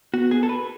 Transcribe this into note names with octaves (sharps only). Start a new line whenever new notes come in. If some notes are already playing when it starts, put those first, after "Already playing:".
B3 F#4
G#4
A4
B4